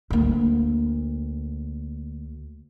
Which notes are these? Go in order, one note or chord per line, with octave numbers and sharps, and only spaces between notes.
D2 A#3